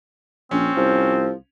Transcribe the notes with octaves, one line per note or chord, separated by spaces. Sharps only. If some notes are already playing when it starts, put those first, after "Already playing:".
A#1 C4 C#4
C2 F3